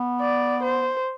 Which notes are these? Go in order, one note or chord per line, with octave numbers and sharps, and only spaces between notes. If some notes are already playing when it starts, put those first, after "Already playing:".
Already playing: B3
D5
C5